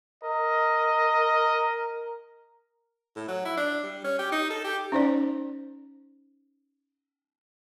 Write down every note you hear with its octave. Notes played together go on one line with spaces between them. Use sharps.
A#4 D#5
A2
F#3
E4
D4
G3
C#4
G4
D#4
A4
G4
C#4 D#4 C5 D5